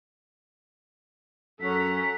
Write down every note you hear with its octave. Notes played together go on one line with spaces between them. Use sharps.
F#2 C#4 A4 F#5 A#5 B6